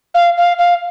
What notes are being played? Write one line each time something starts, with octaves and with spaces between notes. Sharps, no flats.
F5
F5
F5